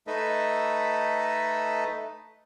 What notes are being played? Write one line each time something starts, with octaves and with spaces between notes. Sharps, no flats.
A3 D#4 A4 B4 D#5 E5